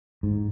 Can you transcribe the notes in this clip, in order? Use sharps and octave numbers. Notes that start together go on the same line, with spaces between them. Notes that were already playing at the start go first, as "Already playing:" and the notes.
G#2